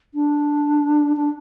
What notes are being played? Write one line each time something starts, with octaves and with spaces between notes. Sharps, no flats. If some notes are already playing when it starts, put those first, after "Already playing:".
D4
D4